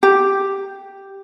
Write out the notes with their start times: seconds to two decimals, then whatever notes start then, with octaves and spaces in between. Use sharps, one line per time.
0.03 G4